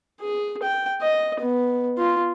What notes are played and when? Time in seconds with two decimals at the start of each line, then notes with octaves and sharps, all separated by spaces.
0.21 G#4
0.63 G5
1.02 D#5
1.40 B3
1.98 F4